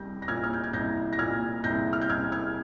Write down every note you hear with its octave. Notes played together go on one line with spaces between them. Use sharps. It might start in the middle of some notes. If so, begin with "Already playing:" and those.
Already playing: C2 G3 G6 A#6
A#6
A#2 F6 G#6
F6
G6
G#6
C2 G6 A#6
A#6
A#2 F6 G#6
C2 G6 A#6
F6
G6
C2 F6 G#6
F6 G#6